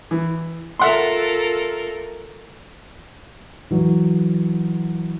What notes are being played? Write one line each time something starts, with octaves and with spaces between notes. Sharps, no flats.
E3
F4 A4 A#4 E5 F#5 C6
E3 F#3